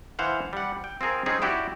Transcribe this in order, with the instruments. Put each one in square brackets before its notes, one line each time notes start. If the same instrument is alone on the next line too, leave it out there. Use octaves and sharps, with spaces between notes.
[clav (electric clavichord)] E3 C5 F5 F#5
G3 F#5
G5
C4 F4 G#4 A#4
C4 C#4 D#4 G#4
E4 F#4 G4 D5